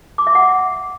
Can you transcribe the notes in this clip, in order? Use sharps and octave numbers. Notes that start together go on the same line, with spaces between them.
D6
E5
F#5